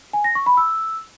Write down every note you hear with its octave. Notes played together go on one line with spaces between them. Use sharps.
G#5
A#6
C#6
B5
E6